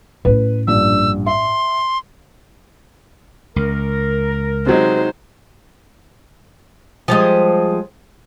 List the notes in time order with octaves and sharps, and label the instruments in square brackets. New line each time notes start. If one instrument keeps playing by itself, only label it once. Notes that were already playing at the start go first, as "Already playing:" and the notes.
[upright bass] A2 C#4 [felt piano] B4
[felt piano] A#1 G2 [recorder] E6
[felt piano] E5 [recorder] C6
[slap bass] C#2 [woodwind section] A#4
[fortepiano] C3 F#3 G#3 [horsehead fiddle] D#4 C5
[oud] F3 G3 G#3